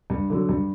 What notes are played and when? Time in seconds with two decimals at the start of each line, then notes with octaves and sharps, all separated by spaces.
0.10 G2
0.30 D3 F#3
0.49 G2